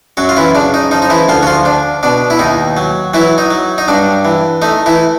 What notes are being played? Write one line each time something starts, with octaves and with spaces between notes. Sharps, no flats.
F#2 F#3 F#4
F4
E3 E4
C#3 D4
D#4
F3 D#4
D#4
E3 E4
D2 F3 F4
F#4
F3 F4
D4
B2 D4
E4
D#2 D#4
F#3
E3 F#3 E4
D#4
F#3
D#4
G2 D4
E3
A3 D#4
E3 E4